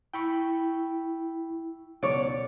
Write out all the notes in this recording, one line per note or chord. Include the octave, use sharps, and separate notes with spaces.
E4 G5 B5 C#6
C#2 B2 F#3 C#5 D5